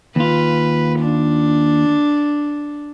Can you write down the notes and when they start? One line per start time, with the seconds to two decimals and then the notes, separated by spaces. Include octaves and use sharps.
0.16 D#2 F4 B4
0.99 D4